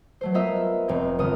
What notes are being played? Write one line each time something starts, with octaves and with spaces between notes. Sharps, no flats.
F#3 A3 C5
B3 F4 A#4 C5 D#5 E5
F1 C4 A#4 G6
G1 G3 D#6 F6